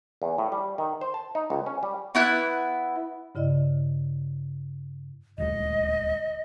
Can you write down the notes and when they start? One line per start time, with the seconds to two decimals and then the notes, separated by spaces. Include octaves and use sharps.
0.22 E2
0.38 A2
0.52 G3
0.78 D#3
1.01 C5
1.14 A5
1.35 D#4
1.50 C#2
1.66 C#4
1.83 G3
2.15 B3 E4 F#6
3.35 G2 C#3 E4 D5 D#5
5.38 D#1 D2 G#3 D#5